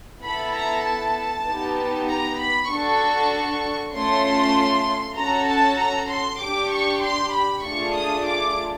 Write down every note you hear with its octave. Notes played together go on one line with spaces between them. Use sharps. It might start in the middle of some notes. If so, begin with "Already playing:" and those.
B3 E4 A4 B5
A#5
A5
B3 D#4 G4
A#5
B5
D4 F#4 A4 C#6
A3 C#4 F4 C6
C#4 F#4 A4 A#5
A5
A#5
C6
D4 G4 D6
C#6
C6
B5
A3 D4 F4 G#4 C#6
D#6
D6